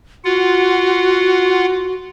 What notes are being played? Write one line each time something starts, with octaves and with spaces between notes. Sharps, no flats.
F4 F#4 F#5